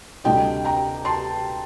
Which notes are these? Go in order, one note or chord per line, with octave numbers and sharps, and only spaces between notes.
D2 C3 G3 D4 D#5 G5
G5 A#5
A5 C6